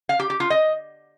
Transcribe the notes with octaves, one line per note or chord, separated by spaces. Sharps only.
F5
G4
G4
F4
D#5